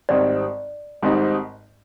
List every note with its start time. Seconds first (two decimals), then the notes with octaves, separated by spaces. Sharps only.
0.09 G#1 G#2 G3 C4 D#4 D5
1.02 G#1 G#2 G3 C4 D#4